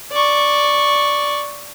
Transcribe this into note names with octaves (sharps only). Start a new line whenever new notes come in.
D5 C#6